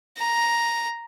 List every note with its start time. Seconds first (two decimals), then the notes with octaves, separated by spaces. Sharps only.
0.18 A#5